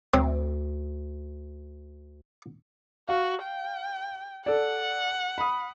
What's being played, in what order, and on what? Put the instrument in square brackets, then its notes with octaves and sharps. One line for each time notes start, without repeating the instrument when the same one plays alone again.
[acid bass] D2 [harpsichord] C4
[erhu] F#4 [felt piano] F5
[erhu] G5
[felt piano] A4 D5 [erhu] F#5
[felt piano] B5 D#6